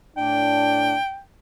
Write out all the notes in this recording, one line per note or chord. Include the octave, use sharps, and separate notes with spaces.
A2 D4 G5